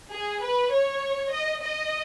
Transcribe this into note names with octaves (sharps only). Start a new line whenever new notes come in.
G#4
B4
C#5
D#5
D#5